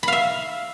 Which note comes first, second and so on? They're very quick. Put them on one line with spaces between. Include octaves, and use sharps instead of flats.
B5 F5 E5